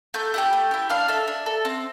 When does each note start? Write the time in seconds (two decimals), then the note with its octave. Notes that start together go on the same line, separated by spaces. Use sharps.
0.14 A3 G6
0.34 E4 G4 G5 G6
0.53 A3
0.71 E4 G4
0.89 D4 F5 F6
1.08 A4 E5 E6
1.28 D4
1.46 A4
1.65 C4